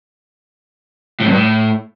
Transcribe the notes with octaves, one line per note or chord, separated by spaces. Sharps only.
A2
F2
G2
A2